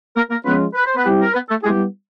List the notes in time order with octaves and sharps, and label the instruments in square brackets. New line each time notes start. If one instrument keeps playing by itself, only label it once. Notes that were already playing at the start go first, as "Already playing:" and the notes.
[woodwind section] A#3 A#4
A#3 A#4
[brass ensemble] F3 G#3 C#4 F4 [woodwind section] B3 B4
[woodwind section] B4
C5
B3 B4
[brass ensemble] G3 C4 E4 G4
[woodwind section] A#4
B3 B4
A3 A4
[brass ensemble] G3 B3 E4 G4 [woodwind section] G#3 G#4